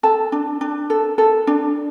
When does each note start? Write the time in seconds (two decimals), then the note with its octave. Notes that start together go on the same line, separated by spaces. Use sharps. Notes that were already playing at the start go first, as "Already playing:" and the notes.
0.03 A4 A5
0.32 D4
0.61 D4
0.90 A4
1.18 A4
1.47 D4